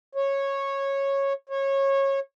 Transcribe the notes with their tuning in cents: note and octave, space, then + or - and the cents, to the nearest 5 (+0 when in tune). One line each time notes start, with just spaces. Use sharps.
C#5 -10
C#5 -20